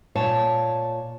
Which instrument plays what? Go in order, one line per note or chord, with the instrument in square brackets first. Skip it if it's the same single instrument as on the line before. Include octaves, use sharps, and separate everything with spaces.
[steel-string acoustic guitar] A#2 C#5 A5